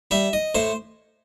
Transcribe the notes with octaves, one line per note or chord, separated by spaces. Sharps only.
G3 E5
D#5
A2 C5